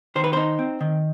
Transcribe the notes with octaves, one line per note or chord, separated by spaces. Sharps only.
D#3 C5
B4
D#4 C5
C4
D#3